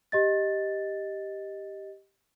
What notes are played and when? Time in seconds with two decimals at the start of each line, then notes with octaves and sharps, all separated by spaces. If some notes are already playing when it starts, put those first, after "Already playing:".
0.12 G4 D#5 A6